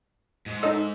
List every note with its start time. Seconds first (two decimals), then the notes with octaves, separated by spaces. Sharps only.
0.46 G#2
0.63 D#4 A4 D#5 E6